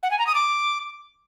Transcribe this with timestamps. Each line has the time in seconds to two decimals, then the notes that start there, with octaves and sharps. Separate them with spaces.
0.03 F#5
0.11 G#5
0.19 A#5
0.27 D#6
0.35 D6